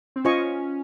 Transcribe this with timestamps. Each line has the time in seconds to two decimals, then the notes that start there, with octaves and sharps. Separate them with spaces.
0.16 C4
0.24 C#4 F4 C5 D#5 G#5 C#6